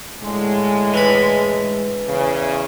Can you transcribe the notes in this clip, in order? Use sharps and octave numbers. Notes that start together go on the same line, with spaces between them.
A2 D3 G#3
E3 B5
E2 C#3